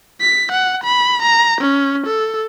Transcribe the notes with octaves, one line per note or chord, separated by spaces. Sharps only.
B6
F#5
B5
A#5
C#4
A4